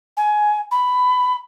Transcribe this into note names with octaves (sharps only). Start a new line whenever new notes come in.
G#5
B5